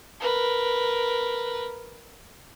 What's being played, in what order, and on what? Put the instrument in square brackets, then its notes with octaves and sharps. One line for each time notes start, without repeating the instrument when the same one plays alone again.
[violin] A#4 B4